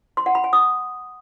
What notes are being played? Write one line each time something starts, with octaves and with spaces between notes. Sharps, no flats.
C6
F#5
B5
G#5
D#6